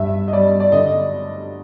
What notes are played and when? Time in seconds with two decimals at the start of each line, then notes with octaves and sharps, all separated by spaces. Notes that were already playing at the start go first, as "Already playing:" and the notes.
Already playing: G2 E5
0.28 D#5
0.33 G3 D5
0.60 D5
0.72 D3 D#5